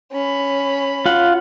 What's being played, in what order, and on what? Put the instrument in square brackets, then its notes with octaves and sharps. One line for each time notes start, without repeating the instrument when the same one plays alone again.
[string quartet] C#4 B5
[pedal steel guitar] F4 F#5